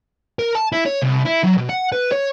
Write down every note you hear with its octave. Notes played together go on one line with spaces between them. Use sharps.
A#4
A5
E4
C#5
C2
E4
F#3
B2
F#5
B4
C#5